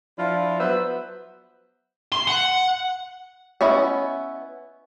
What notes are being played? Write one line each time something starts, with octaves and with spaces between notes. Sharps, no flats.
F3 D4 E4 F4
F#3 B3 B4 C5 E5
C6
F#5
B3 C#4 E4 D#5